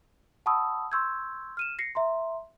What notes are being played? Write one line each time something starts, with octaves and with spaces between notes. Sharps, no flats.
F#5 A5 B5 C#6 D#6 E6
C6 C#6 E6 G6 G#6
F6 D#7 E7
A#6 C7 C#7
E5 A#5 C6